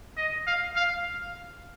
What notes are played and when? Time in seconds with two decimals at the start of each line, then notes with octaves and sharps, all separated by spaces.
0.17 D#5
0.47 F5
0.76 F5